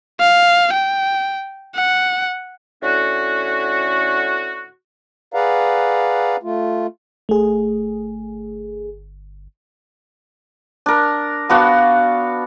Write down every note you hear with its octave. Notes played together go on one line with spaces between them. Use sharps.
F5
G5
F#5
A2 D3 C#4 F#4
G#4 B4 D5 F5 F#5 A#5
A3 F4
G1 A3 G#4
D4 A#4
B3 D4 F#4 F5